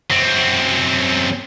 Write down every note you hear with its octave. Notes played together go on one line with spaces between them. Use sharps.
F#2 C4